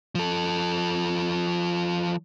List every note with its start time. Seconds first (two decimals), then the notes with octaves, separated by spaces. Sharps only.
0.15 F3 A4